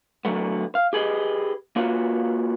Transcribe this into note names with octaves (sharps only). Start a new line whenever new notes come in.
D3 F#3 A3 B3
F5
G4 G#4 B4 D#5
A#3 F4 F#4 B4 C#5